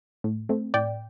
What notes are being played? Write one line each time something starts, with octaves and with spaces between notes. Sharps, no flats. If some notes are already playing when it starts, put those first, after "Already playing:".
A2
A3 C4
A2 D5 G5